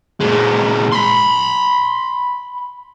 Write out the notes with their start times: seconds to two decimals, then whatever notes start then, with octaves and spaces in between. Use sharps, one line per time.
0.20 A#2 G#3
0.92 B5 C6